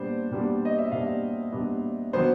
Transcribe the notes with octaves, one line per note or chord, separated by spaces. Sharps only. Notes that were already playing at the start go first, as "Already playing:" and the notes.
Already playing: A#2 G3 B3 D4 C5
A#2 G3 B3 D4
D#5
E5
A#2 G3 B3 D4 F5
A#2 G3 B3 D4
D#3 F#3 B3 D4 C5